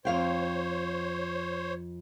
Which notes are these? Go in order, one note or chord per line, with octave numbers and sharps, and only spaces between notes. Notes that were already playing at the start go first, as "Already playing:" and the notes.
F2 C5 C#5 F5 G5